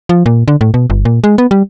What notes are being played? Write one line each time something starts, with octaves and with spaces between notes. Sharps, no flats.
F3
A#2
D3
A2
B2
G1
A#2
G#3
B3
G3